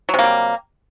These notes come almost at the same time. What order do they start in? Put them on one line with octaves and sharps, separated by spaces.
F#3 C3 A#3 G3